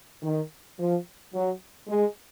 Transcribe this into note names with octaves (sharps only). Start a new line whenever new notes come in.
D#3
F3
F#3
G#3